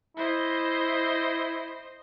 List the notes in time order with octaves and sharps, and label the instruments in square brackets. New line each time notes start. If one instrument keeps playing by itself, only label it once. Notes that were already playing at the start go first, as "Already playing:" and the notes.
[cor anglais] E4 [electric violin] C5 D#5